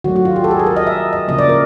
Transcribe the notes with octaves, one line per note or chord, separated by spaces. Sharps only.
D#3 F#3 A3 F#4
F#4
F4
G4
A4
G#4
A4
A#4
D#5
E5
D#5
C#3 F3 A#3 D#5
D5
A#4